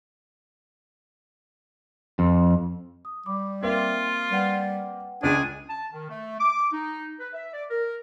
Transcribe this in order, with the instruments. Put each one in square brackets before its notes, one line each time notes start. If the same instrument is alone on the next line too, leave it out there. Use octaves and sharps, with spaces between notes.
[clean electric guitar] F2
[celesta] D#6
[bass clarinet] G3 [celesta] B5 D6
[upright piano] A#3 C4 [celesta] D#4 E5 G5 [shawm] F4
[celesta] F5
[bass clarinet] G3 [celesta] B4 F#5 G5
[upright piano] C#2 C#3 [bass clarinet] D4 [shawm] G#4
[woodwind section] A5
D#3
A3
D6
D#4
B4
E5
D5
A#4